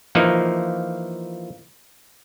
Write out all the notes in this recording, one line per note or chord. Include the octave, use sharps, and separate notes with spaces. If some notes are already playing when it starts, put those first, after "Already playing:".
E3 F3 A#3 D#4